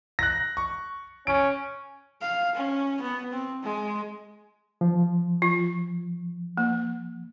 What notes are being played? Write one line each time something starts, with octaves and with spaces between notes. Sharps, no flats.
F#6 A#6
C#6
C#4 D7
F5
C#4
B3
C4
G#3
F3
F4
A#3